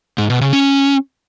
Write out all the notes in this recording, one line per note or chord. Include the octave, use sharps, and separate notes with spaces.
G#2
B2
C#3
C#4